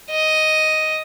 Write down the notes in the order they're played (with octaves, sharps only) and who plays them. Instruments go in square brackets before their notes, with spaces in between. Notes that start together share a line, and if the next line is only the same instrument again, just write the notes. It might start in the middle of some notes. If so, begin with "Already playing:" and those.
[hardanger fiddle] D#5